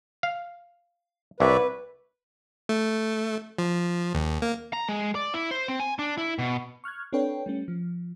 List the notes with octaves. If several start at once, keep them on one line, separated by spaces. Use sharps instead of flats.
F5
C2 B4 C#5 D5 E5
A3
F3
D#2
A#3
A#5
G#3
D5
E4
C5
C4
G#5
D4
E4
B2
C#6 F6 F#6 G#6
C4 D4 A4 B4 C#5 G5
G3 A3 C#4
F3